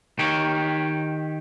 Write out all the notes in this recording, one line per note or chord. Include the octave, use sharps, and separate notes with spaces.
D#3 D#4 G4 C#5